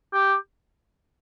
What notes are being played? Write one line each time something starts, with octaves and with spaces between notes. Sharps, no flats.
G4